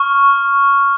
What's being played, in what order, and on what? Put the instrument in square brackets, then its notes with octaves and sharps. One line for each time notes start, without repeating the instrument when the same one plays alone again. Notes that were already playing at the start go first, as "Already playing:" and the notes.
Already playing: [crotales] C#6 F6